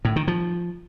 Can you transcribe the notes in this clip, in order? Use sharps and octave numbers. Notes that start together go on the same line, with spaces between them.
A2
D#3
F3